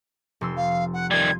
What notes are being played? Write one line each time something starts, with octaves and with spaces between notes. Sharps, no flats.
F1 C6 E6
F5
F#5
D#3 G3 C6 G#6